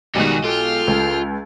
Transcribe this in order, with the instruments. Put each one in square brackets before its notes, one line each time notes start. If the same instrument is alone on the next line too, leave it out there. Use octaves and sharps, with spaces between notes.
[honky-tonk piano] B1 G#3 F#6 [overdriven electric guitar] G2 D#3 [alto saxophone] G3 [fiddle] F#4 D#6
[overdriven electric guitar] F4 [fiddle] G4 F6 [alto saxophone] A4
[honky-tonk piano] C#2